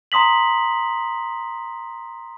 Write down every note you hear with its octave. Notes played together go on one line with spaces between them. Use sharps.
A#5 C6 D#6 B6 F#7